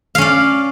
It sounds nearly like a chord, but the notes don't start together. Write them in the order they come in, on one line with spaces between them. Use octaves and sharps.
F5 C#4 D5